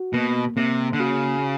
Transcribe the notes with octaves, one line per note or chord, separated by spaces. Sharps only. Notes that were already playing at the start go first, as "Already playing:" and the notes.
Already playing: F#4
B2 A#3
C3 A#3
D3
C#3 F#4